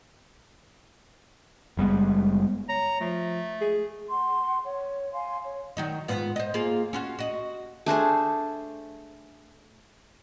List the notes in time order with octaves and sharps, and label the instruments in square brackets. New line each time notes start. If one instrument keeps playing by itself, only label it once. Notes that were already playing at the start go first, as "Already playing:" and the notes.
[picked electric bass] F#1 G3 G#3 B3
[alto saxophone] C#5 [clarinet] A#5
[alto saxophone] F3 [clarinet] A3
[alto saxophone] G#4
[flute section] F#5 C6
C#5
F5 G#5 C6
C#5
[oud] D#3 F#3 D#4
G#2 B3 F4
C5 D#5
A#3 F4 G#4
C#4 F4 F#4
F#4 D#5
[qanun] A3 D4 G#4 C5